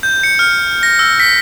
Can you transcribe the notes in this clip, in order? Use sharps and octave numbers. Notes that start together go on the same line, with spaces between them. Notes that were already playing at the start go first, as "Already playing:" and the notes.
G6
C#7
F6
A#6
E6
B6